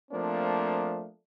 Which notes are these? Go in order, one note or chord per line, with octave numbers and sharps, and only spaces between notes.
F3 A3 A#3 C4 D4